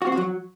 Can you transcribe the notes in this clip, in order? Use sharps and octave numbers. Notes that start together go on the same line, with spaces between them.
F#4
C4
F#4
F#3